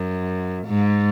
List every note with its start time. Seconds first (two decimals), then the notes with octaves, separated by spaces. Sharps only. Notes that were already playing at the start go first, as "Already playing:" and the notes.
Already playing: F#2
0.67 G#2